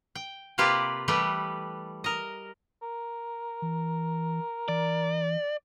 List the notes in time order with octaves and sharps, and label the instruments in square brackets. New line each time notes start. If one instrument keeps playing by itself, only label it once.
[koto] G5
C3 A#3 F4 G4 B4 D5
E3 G3 A3 G4 B4
A#4 D#5
[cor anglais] A#4
[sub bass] E3
[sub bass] E3 [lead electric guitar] D5